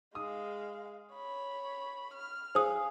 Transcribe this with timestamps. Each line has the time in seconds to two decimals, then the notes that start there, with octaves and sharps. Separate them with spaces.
0.15 G#3 F5 D#6
1.14 C#5 B5
2.14 F6
2.55 G#4 C5 F5 D#6